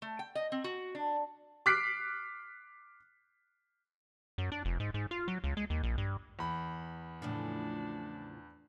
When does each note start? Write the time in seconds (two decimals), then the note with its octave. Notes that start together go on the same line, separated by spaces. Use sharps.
0.02 A3
0.19 G5
0.35 D#5
0.52 C4
0.64 F#4
0.95 D4
1.66 D6 F6 F#6 B6 C7 D7
4.38 F#2
4.52 D4
4.65 F1
4.80 G#2
4.94 G#2
5.11 F4
5.28 F#3
5.44 C#2
5.57 G#3
5.70 D#2
5.83 A#1
5.98 G2
6.39 E2 B5
7.22 A2 C#3 F3 D4